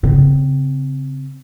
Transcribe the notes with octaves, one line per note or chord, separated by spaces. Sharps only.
C#3 C4